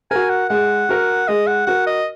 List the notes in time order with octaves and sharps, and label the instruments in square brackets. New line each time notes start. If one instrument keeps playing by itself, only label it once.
[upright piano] F#4 A#4 [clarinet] G#5
[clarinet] F#5
[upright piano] G#3 [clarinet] F#5
[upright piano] F#4 A#4
[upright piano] G#3 [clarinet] D#5
[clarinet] F#5
[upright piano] F#4 A#4 [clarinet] F#5
[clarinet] D#5